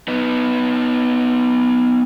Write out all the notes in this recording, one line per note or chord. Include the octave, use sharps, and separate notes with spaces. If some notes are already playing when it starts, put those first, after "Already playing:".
B3 D#4